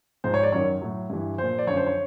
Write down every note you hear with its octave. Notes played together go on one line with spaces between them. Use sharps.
G#2 F3 C5
C#5
D5
F#2 D#3 F#3 C#5
A2 F#3
G2 E3
A#2 F3 C5
D5
F#2 D3 F3 C#5
C5
C#5